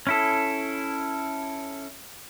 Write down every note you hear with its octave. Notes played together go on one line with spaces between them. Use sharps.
C#4 E4 A4